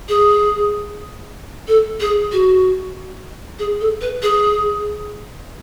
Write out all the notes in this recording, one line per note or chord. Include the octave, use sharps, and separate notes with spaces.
G#4
A4
G#4
F#4
G#4
A4
B4
G#4